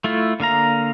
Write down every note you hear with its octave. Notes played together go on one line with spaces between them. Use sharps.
A3 E4 F4
D3 A#3 F5 A#5